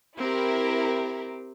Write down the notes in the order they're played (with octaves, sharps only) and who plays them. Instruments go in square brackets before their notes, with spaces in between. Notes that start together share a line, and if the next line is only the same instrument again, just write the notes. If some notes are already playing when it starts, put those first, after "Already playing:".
[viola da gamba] C4 G4 [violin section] E4 A#4